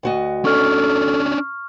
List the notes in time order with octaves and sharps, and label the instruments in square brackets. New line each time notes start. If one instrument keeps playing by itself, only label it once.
[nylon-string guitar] D2 F#4 D#5
[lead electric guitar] C#4 D4 [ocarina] A4 [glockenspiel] C#6 F6